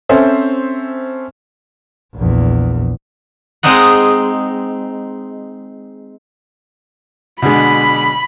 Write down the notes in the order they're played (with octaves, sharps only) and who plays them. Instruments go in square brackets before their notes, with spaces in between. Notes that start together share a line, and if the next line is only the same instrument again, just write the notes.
[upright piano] C4 C#4 A4 C5 E5
[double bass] A#1 E2
[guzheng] G#3 C4 D#4 D#5 F#5
[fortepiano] B2 D3 G#3 [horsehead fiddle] B5